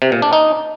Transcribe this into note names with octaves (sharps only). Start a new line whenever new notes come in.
C3
A#2
D4
D#4